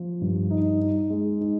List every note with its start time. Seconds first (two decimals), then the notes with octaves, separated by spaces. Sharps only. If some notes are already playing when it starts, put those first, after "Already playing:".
Already playing: F3
0.21 G2
0.51 D#4
0.81 D#4
1.10 G#3
1.41 D#4